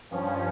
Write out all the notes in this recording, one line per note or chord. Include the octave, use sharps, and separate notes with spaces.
G2 F3 C#4